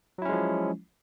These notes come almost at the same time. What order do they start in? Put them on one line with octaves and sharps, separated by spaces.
F#3 E4 C#4 G#3 F3